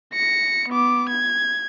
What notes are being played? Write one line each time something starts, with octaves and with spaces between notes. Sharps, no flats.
A#6 C#7
B3 D6
G#6